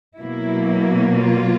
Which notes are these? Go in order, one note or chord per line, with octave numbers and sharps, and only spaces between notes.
B2 F#3 A#3 E4
F4